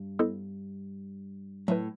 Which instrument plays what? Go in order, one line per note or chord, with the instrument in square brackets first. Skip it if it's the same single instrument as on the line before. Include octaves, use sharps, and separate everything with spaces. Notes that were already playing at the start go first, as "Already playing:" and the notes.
Already playing: [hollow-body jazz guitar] G2
[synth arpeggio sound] B3 E4 A4 C5 D#5
[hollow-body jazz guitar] A2 [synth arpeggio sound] F#3 A3 E4 B4